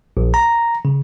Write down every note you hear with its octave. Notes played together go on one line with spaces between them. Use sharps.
A#1
A#5
C#3